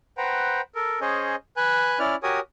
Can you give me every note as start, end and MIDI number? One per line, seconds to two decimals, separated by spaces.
0.18 0.61 71
0.18 0.61 72
0.18 0.61 78
0.18 0.61 79
0.18 0.61 82
0.75 1.00 69
0.75 1.00 70
1.01 1.36 61
1.01 1.36 68
1.01 1.36 72
1.01 1.36 73
1.01 1.36 75
1.57 1.99 71
1.57 1.99 80
1.57 1.99 90
1.99 2.16 61
1.99 2.16 64
1.99 2.16 74
1.99 2.16 89
2.23 2.40 66
2.23 2.40 67
2.23 2.40 70
2.23 2.40 73
2.23 2.40 80
2.23 2.40 87